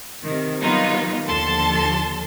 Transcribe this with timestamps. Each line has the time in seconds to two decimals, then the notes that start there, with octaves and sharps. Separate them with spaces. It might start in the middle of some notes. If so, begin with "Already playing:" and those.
0.23 C3 D#3
0.62 D#3 F#3 G3 B3 D#4 F4
1.26 D#2 D3 F3 A4 A5 C6